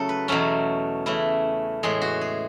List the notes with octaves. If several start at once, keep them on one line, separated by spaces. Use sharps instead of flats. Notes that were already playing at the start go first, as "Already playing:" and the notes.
Already playing: C#3 F#3 A3 E4 A4
B4
E2 B2 F#3 A3 C#4 A4
C#3 E3 A3 E4
A2 E3 G#3 G#4
F#4
G#4